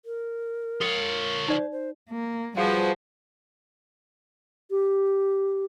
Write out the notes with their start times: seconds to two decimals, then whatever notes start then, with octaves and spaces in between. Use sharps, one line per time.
0.05 A#4
0.81 F4 A4 C#5
1.48 D#4 C5 D5
1.72 C5
2.10 A#3
2.56 F3 G3 F#4 G#4 B4
4.71 G4